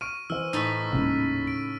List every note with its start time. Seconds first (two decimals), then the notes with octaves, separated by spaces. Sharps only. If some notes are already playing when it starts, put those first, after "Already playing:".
0.01 C#6 F6 D7 D#7
0.30 E3 C5 E6 F6
0.53 A2 D#4 E6 A6 B6
0.92 D#1 C#3 G#3
1.47 D7